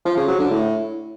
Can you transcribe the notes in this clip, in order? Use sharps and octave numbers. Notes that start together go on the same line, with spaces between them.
F3
C#3
F#3
D3
A2